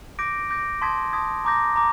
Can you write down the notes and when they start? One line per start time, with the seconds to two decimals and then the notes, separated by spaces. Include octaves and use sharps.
0.19 D6 G6 A#6 D7
0.50 D6 G6 A#6 D7
0.81 A5 C6 D#6 G#6 B6
1.13 A5 C6 D#6 G#6 B6
1.45 A#5 D6 G6 A#6
1.76 A#5 D6